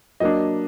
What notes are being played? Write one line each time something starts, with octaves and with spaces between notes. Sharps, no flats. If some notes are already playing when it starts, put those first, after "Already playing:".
F#3 A#3 D4 D#5